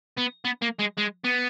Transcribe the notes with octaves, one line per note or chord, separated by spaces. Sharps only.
B3
B3
A#3
G#3
G#3
B3